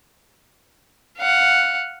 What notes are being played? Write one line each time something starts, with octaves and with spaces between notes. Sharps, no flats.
F5 F#5